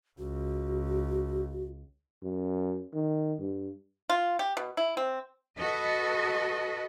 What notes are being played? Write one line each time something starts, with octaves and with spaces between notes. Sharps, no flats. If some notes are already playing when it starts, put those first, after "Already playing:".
C#2 F#4
F#2
D#3
G2
F4
G4
B2
E4
C4
F#4 A4 B4 D#5